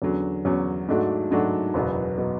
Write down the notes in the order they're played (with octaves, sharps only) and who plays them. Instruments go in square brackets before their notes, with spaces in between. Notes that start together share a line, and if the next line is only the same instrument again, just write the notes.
[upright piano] E2 D3 F#3 C#4
E2 D3 F#3 C#4
G#2 F#3 A3 D4 F#4
G#2 F#3 A3 D4 F#4
F#1 E2 B2 F#3 B3
B2 F#3 B3